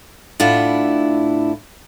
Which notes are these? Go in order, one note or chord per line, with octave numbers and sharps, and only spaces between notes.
A2 D4 E4 F4 F#5